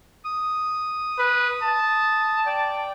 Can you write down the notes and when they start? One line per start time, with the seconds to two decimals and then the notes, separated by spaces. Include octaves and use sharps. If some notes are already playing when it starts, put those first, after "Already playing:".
0.25 D#6
1.19 B4
1.63 A5
2.46 D5 G5